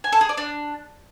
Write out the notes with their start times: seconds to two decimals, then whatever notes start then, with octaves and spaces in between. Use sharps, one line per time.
0.04 G#5
0.12 A4
0.21 G#4
0.29 D5
0.38 D4